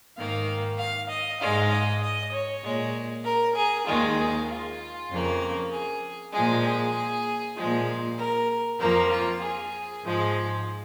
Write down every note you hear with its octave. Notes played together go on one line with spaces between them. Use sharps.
G#2 D#3 A#3 F5
F5
D#5
G#2 G#3 F5
D#5
D#5
C#5
A#2 G#3
A#4
G#4
D#2 D#3 G#3 F4
G#4
F4
F2 C#3 A#3
G#4
A#2 F3 G#3 G#4
G#4
A#2 F3 G#3
A#4
F2 F3 A#3 A#4
F4
G#4
G#2 F3 G#3